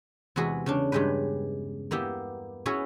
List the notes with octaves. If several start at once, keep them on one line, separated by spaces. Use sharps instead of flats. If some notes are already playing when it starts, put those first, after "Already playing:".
E2 C3 G#3 F#4 G#4 B4
C#3 C#4 D4
G2 C#3 G#3 G4 B4
A#3 B3 E4 G4
C#4 E4 F#4 G#4 B4 C#5